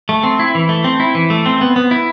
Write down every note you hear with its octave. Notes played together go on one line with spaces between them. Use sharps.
A3
C4
E4
E3
A3
C4
E4
E3
A3
C4
B3
B3
E4